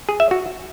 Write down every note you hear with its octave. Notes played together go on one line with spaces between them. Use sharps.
G#4
E5
F#4